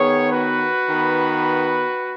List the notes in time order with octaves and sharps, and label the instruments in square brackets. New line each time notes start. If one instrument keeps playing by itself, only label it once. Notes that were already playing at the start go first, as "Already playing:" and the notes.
Already playing: [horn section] D#3 B3 G#4 C#5
F#4 B4
D#3 B3